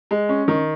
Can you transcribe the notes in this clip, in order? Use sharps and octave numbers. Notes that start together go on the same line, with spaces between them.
G#3
C#4
D#3